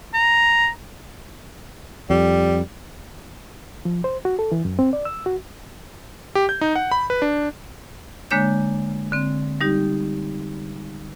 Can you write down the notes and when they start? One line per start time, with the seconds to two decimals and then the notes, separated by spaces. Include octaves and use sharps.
0.14 A#5
2.10 F2 G3
3.85 F3
4.04 C5
4.25 F#4
4.39 A4
4.52 E3
4.65 F#2
4.79 C4
4.93 D5
5.05 E6
5.26 F#4
6.35 G4
6.49 G6
6.61 D#4
6.76 F#5
6.91 B5
7.10 B4
7.22 D4
8.31 D3 G#3 A#3 D4 C#5 G6
9.12 D3 C4
9.61 G3 D#4 G4